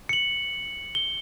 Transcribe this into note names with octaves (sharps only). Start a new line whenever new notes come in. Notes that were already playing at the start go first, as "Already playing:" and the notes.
C#7 F#7
G7